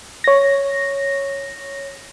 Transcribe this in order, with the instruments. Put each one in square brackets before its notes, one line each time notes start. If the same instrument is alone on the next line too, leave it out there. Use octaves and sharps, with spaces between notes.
[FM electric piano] C#5 A#6